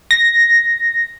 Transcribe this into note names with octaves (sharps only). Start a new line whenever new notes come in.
A#6